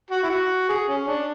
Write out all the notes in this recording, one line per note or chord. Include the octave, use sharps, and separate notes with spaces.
F#4
E4
F#4
G#4
C#4
D4